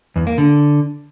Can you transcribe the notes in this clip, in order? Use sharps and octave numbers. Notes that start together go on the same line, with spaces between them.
E2
A#3
D3